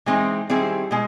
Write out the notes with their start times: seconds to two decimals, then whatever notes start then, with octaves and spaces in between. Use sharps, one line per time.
0.06 E3 G#3 C4 D#4
0.49 D#3 G3 C4 E4 G#4
0.91 B2 G#3